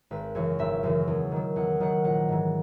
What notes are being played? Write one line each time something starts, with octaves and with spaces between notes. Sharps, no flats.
G#1 B4
F#2 C#3 E3 C#5
G#1 E5
F#2 C#3 E3
E2
D#3 F#3
E2 F#5
D#3 F#3 F#5
A#1 F#5
G#2 E3